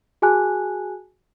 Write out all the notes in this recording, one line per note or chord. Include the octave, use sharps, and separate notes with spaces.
F#4 G#4 G#5 A5 F#6